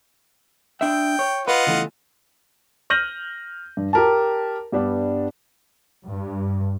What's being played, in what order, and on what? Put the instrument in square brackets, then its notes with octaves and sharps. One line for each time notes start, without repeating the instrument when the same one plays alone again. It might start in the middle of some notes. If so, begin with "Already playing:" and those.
[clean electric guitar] D4 E5 [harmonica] G5
[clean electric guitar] C#5
[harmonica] F4 D#5 F#5 [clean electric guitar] B4
[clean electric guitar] C#3 E3 A3
[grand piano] F6 G6 A#6 D#7 F#7
G2
G4 A#4 A5
G2 G3 B3 D4
[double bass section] G2